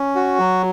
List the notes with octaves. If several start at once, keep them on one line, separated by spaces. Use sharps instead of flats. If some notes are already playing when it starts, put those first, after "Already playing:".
Already playing: C#4
F#4
F#3